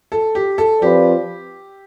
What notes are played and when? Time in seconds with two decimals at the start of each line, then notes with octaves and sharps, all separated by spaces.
0.12 A4
0.35 G4
0.58 A4
0.81 F3 C4 F4 G4 B4 D5